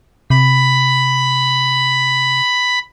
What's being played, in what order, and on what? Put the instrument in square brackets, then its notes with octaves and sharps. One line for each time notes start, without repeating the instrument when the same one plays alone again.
[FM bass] C3 [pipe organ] B5